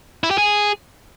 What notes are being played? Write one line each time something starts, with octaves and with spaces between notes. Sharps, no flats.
E4
G4
G#4